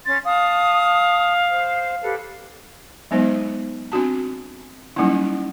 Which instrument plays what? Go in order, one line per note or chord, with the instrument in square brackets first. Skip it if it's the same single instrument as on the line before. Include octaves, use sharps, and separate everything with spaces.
[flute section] C#4 C6 [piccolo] A6
[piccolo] F5 [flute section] A5 D#6
[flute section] C5
G4 A4 B4
[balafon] F#3 G#3 B3 D#4 C5
C4 D4 F#4 A5
F#3 G3 A#3 C#4 D#4 E4